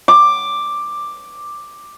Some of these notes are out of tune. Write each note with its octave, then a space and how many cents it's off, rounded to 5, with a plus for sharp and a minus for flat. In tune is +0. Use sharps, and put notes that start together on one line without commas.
D6 +5